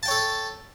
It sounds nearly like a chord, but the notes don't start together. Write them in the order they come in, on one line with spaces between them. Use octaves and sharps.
A5 G5 C#5 A4